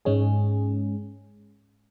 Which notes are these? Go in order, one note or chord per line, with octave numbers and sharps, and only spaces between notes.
G#2 G#3 C#4 G#4